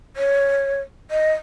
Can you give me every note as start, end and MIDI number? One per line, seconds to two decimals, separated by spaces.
0.16 0.80 73
1.11 1.31 75